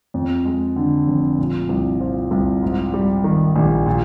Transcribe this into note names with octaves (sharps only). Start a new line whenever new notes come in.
F2
G#3
D3
F1
A#2
C2
F3
C2
G#2
G3
D#3
A#1
A#2